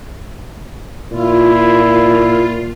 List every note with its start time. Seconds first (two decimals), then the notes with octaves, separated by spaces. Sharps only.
1.11 A#2 E4 F4